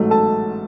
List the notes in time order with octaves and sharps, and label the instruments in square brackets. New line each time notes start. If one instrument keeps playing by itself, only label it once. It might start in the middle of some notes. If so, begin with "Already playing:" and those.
Already playing: [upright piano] A1 G#2 F#3 A3
A4 A5